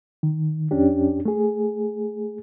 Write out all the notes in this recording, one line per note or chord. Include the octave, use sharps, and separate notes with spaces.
D#3
F2 C#4 D4 G4
A3 G#4